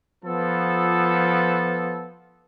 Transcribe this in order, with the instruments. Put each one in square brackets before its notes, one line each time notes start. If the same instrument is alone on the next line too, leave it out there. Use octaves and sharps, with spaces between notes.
[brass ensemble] F3 B3 A4